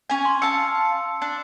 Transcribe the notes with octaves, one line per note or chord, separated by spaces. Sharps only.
C#4 G#5
C6
F5 A5 E6 C#7
D4